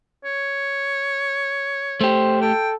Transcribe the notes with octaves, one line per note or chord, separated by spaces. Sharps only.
C#5
A3 G4 C5
A4 G5